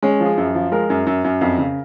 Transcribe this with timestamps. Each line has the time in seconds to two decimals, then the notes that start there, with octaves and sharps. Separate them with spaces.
0.02 G#3 C#4
0.20 F3
0.25 G#4
0.37 F#2
0.54 F3
0.72 G#3 A#4
0.90 F#2
1.06 F#2
1.24 F#2
1.41 F2
1.58 C#3